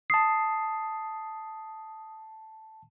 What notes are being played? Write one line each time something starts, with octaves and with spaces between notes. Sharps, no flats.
A5 D#6 C7